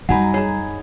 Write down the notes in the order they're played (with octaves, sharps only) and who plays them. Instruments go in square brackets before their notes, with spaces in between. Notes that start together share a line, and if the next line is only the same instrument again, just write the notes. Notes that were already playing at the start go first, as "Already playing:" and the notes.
[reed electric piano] F#2 G#5 B5 [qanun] F#3 D#4 D#5 [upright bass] G3 [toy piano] F#5
[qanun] G#4 [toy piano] C#5 A#5